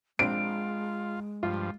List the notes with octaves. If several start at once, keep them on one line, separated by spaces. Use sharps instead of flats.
A#1 G#3 C4 D4 F4 D7
G2 F3 F4